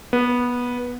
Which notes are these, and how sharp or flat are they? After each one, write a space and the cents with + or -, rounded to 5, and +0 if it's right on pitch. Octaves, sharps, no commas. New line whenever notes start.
B3 -15